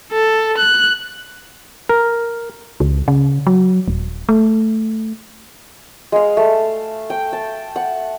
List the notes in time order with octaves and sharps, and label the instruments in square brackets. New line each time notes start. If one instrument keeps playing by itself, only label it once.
[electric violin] A4
F#6
[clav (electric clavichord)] A#4
[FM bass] C#2
C#3
F#3
D#1
A3
[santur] G#3 F5
A3
G5
A5
F#5